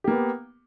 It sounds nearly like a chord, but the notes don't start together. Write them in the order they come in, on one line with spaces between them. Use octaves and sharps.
G4 A#3 B3